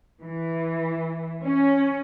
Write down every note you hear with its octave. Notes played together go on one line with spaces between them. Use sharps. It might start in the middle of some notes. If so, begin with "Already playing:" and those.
E3
C#4